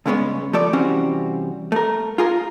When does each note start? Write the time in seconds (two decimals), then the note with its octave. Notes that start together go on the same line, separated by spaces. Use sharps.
0.06 C#2 G2 C#3 G#3 B3 C#4
0.53 F3 A3 A4 D5
0.73 C3 E3 G3 C4 C#4 F#4
1.72 A3 A#4
2.18 F4 G#4 A#4